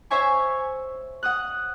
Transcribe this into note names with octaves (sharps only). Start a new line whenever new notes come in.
C5 C#5 E5 G#5 C#6
F#5 D#6 F#6